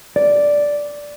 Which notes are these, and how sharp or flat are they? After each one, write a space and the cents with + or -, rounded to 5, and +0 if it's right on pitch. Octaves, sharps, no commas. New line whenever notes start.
D5 -5